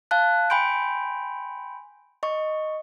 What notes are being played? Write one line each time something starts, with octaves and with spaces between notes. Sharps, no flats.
F5 A5 F#6
G5 G#5 B5 C6 G6 D7
D#5 C#6